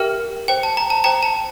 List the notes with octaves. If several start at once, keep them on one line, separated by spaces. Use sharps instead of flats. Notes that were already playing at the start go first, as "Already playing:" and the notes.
Already playing: G4 A#4 E5 G5 F6
C5 G5
A5
A#5
A5
C5 G5 A#5
A5